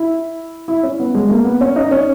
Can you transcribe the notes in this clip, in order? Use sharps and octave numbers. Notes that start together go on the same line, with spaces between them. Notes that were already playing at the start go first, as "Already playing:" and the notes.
Already playing: E4
E4
C#4
B3
G#3
A#3
B3
C#4
D#4
C#4